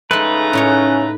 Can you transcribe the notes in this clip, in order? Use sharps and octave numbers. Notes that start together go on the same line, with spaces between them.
C#3 G#3 A3 D#4 B4 A#5
A2 C#4 D#4 C#5